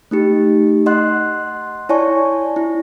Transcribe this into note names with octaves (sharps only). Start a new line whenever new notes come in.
A3 D#4 G4
D#5 F#5 C6 F#6
E4 C#5 D5 G#5 A5 C#6
E4